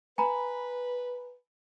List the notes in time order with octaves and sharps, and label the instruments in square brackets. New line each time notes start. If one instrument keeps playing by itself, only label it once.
[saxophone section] B4 [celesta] G#5 A#5 B5